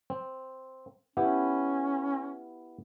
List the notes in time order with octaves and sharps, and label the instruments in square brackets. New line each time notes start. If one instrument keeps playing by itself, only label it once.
[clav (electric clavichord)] C4
[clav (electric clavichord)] B3 E4 G4 [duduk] C#4